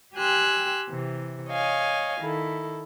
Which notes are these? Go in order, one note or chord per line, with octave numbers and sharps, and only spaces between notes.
G4 G5 G#5 C6 E6 F#6
C3 E3
C#5 D#5 F5 G#5
D#3 E4 A4